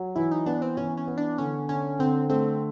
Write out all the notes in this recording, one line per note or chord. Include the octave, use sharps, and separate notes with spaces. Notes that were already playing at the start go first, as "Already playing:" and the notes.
Already playing: F#3
E3 E4
D#4
B3 D4
C4
E3 C#4
C#4
B3
D4
D3 C#4
D3 C#4
D3 C4
A3 C4